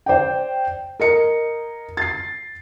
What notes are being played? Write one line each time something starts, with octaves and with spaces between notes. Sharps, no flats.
C5 D5 G5
A#4 D#5 C#7
A6 C7